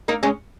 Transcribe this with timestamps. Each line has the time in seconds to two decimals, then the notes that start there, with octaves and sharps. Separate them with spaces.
0.08 A#3 D#4
0.23 G#3 C#4